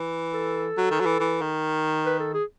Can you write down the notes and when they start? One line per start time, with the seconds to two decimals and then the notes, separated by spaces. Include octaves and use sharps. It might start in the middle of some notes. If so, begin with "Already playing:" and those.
Already playing: E3
0.34 A4
0.77 F#3
0.91 D#3
1.00 F#3
1.05 E3
1.20 E3
1.41 D#3
2.06 B4
2.20 A4
2.34 G#4